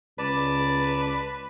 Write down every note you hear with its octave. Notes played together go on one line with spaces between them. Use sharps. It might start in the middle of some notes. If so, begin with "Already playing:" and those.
C#2 B4 D5 A5